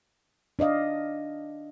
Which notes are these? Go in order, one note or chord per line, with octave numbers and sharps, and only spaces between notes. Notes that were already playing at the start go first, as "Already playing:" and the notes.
D4 D5 D#5 F5